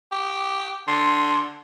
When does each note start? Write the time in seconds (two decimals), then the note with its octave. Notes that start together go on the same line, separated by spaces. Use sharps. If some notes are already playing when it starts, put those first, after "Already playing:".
0.12 G4
0.87 D3 C6